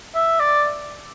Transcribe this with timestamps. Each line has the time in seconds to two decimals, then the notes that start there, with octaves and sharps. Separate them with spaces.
0.15 E5
0.40 D5